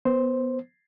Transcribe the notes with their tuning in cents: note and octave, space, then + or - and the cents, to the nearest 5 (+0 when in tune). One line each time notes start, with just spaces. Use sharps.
B3 +0 C5 +0